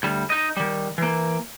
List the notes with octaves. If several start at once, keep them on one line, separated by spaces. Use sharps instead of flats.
D2 G3
D#4 D#5
D#3 G3
E3 A#3